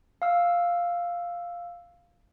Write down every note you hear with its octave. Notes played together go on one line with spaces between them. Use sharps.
F5 E6